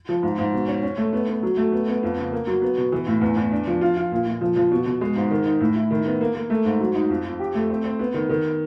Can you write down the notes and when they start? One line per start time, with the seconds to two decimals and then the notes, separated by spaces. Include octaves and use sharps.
0.09 F3
0.23 G#2
0.38 G#2
0.53 B2
0.68 C#4
0.83 C#4
0.97 A3
1.13 B3
1.28 B3
1.43 F#3
1.57 A3
1.72 B3
1.88 B3
2.03 F2
2.17 C#3
2.32 A#3
2.47 F#3
2.62 B3
2.77 B2
2.92 E3
3.07 A2
3.21 E2
3.36 E2
3.51 D4
3.67 F3
3.81 F4
3.97 F4
4.12 A#2
4.27 A#2
4.41 F3
4.56 F3
4.71 B2
4.86 B2
5.01 G#3
5.16 G#2
5.31 D#3
5.46 D#4
5.61 A2
5.76 E4
5.91 D#3
6.06 B3
6.21 A#3
6.35 A#3
6.50 A3
6.65 G#2
6.80 F#3
6.95 D#4
7.10 F2
7.25 F2
7.40 G4
7.55 A3
7.70 C4
7.84 C4
7.99 B3
8.14 D#3
8.29 D#3